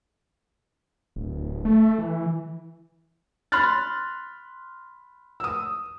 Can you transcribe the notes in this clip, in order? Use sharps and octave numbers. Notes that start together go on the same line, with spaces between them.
D1
A3
E3
B5 C6 F6 F#6 A6
D#6 E6